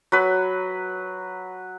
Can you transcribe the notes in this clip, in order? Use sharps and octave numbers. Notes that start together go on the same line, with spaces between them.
F#3 B4